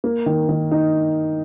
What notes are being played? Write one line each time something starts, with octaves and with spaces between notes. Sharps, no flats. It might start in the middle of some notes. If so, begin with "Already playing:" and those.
A#3
D#3
D#3
D#4